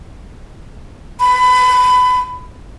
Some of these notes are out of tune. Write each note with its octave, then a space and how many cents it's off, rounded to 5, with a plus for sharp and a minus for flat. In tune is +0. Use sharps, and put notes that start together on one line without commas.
B5 +25